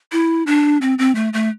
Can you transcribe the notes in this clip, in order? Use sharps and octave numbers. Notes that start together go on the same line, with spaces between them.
E4
D4
C4
C4
A3
A3